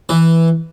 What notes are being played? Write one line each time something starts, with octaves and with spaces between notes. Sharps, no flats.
E3